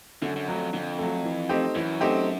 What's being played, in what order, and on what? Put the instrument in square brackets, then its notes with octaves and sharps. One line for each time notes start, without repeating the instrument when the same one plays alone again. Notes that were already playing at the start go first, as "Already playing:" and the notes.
[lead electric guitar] F#2 [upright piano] D3
[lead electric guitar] F#2
[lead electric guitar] F2 [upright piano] F#3 A3
[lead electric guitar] F2 [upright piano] D3
[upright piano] F#3 A3
E3
A3 C4 D#4 G4
[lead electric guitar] F#2 [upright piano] E3
[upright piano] A3 C4 D#4 G4